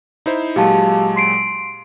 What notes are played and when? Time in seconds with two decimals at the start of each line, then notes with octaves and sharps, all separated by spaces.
0.26 D#4 E4 C5
0.56 A#2 F#3 G#3 G4 F5 A5
1.16 C6 C7 D7